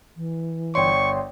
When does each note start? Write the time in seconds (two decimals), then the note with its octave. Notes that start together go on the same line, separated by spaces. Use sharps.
0.16 E3
0.75 G1 C#5 D5 G5 C6 C#6